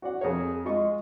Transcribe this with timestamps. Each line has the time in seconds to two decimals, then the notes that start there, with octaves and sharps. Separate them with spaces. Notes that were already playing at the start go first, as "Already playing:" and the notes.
0.02 F#4 D5 F#5
0.21 F2 G#4 A#4 C#5
0.65 G#3 F4 D#5 C#6